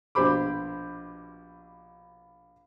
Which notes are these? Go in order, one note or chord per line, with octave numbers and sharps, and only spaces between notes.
A#1 B2 G4 C5 B5 D6